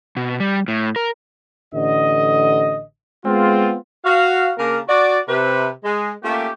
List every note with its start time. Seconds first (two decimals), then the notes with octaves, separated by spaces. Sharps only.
0.17 B2
0.40 G3
0.68 A2
0.96 A#4
1.73 A1 D3 D#5
3.25 G#3 B3 C4 F4
4.05 F#4 F5
4.58 C#3 A#3 D4 A#4
4.89 F#4 D5
5.28 C3 B4
5.84 G#3
6.23 A3 A#3 C#4 F4 G4